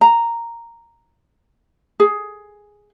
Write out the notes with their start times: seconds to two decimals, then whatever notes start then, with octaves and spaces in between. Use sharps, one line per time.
0.01 A#5
2.00 G#4